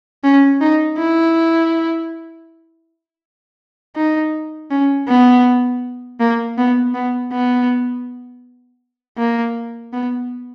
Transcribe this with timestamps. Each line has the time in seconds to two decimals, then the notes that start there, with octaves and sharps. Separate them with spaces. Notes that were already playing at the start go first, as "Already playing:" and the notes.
0.24 C#4
0.61 D#4
0.98 E4
3.96 D#4
4.71 C#4
5.08 B3
6.20 A#3
6.58 B3
6.94 B3
7.32 B3
9.18 A#3
9.93 B3